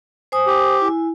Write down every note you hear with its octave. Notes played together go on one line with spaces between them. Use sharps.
C5 G#5 D#6
G4
E4 G#5